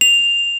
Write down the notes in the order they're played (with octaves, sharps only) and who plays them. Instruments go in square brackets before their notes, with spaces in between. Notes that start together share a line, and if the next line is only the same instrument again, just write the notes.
[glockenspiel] F7